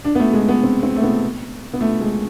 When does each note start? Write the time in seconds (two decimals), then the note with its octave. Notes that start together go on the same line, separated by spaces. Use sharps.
0.05 D4
0.15 B3
0.20 A3
0.34 G#3
0.49 B3
0.64 C4
0.83 C4
0.96 A3
1.03 B3
1.74 B3
1.81 A3
2.01 G#3